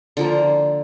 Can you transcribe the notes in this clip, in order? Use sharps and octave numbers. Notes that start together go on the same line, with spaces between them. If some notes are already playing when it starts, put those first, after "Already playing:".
D3 F3 A#3